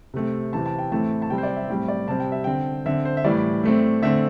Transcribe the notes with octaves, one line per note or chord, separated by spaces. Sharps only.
C3 A3 C4
C3 E3 C4 A5
A5
G5
A2 E3 A3 C4 A5
A5
C3 G3 C4 G5
C5
D5
E5
A2 G3 C4 G5
D5
C3 G3 C4 A5
G5
E5
D3 C4 G5
D3 C4 E5
C5
E5
A2 E3 G3 D5
A2 A3 C4
D3 A3 C4 E5